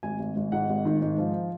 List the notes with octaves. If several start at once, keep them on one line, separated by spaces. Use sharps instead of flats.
G#1 G#5
G#1
G#1
G#2 F#5
G#1
D#3
G#2
F3